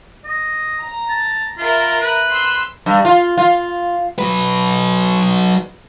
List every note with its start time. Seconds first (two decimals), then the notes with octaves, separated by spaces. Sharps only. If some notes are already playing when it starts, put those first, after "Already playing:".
0.24 D#5
0.79 A#5
1.09 A5
1.58 F4 A#4 E5 B5
2.01 B4
2.30 C6 E6
2.86 G2
3.05 F4
3.38 F4
4.19 F#3 B4